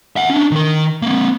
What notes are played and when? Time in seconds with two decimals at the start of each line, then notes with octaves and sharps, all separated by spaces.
0.16 E5 F#5
0.30 C#4 D4
0.51 D#3 A#4
1.02 A#3 C4